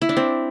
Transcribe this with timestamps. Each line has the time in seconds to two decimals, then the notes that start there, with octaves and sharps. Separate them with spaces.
0.02 E4
0.09 D4
0.17 C4